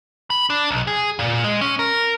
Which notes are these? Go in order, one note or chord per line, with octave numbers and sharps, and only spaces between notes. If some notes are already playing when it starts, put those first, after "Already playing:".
B5
D4
B1
G#4
A#2
G#3
C#4
A#4